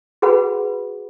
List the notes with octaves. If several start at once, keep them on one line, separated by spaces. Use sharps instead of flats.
F#4 G#4 B4 F#5 B5